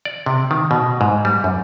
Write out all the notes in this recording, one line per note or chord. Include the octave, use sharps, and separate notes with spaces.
D5
C3
D#3
B2
G#2
G3
F#2